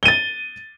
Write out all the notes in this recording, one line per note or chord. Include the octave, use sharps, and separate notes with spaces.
A6 D#7 G7